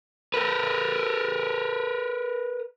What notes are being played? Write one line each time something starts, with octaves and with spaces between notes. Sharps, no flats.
A#4 B4